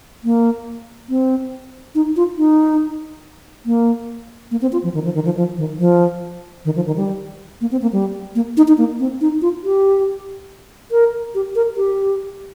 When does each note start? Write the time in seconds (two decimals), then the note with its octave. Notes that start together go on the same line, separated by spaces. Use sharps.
0.24 A#3
1.09 C4
1.95 D#4
2.16 F4
2.38 D#4
3.66 A#3
4.51 A#3
4.62 C4
4.72 F4
4.84 F3
4.94 D#3
5.05 F3
5.15 D#3
5.25 F3
5.37 F3
5.58 D#3
5.79 F3
6.65 D#3
6.76 F3
6.87 D#3
6.96 G3
7.61 A#3
7.71 C4
7.82 A#3
7.93 G3
8.35 A#3
8.57 D#4
8.68 D#4
8.78 A#3
8.99 C4
9.21 D#4
9.42 F4
9.64 G4
10.91 A#4
11.35 G4
11.55 A#4
11.77 G4